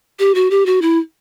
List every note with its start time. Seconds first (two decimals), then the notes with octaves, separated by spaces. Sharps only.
0.19 G4
0.35 F#4
0.51 G4
0.66 F#4
0.82 E4